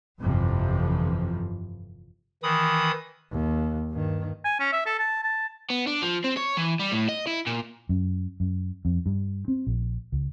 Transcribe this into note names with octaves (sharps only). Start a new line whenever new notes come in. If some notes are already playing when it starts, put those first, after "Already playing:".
G1 F2 C3 E3 F3
D#3 E3 B5 D#6
D#2
G2 D#3
G#5
C#4
E5
A4
A5
A5
B3
D4
F3
C4
C#5
E3
G3
A2
D#5
E4
A#2
F#2
F#2
F2
G2
C4
A#1
C#2